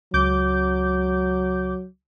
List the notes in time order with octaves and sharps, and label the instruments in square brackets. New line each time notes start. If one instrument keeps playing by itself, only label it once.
[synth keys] C#2 D6 G6 [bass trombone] F#3